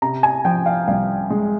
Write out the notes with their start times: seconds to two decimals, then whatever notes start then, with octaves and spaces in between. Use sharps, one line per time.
0.02 C3 A#5
0.23 G#5
0.45 F3 G5
0.66 F5
0.88 C2 F5
1.30 G#3